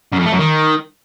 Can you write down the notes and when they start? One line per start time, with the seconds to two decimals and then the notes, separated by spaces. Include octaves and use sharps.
0.13 F#2
0.20 F2
0.26 A3
0.33 F#2
0.39 D#3